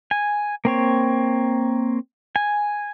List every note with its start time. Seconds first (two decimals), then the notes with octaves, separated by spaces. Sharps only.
0.11 G#5
0.65 A#3 C4 C#5
2.36 G#5